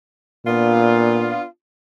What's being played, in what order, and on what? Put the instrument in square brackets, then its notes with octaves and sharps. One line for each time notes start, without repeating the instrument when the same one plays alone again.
[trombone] A#2 [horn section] B3 D4 F4